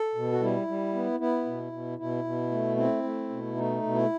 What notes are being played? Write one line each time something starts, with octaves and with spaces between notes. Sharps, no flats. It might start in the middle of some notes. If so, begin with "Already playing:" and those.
Already playing: A4
B2
F#4
G3 E4
G3
B3
B3 E4
B2
B2
B2 E4
B2
A3
C4 E4
A3
B2
A3 D#4
B2
E4